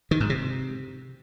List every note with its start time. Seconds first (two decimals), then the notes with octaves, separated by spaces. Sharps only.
0.11 D#3
0.20 G#2
0.30 C3